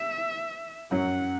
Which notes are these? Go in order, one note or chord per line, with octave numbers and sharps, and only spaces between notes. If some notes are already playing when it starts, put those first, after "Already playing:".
Already playing: E5
F#2 F#3 F#5